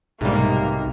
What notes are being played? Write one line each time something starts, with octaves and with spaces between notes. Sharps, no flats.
B1 G#2 C3 G3 A#3 D#4